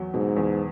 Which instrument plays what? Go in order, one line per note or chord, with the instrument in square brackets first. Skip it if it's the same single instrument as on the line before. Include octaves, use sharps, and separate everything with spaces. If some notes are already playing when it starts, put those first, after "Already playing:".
Already playing: [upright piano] E2 F#3
[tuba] G#2 [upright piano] B2
[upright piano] E2